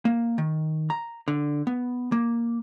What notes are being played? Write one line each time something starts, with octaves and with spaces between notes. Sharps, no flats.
A#3
D#3
A#5
D3
B3
A#3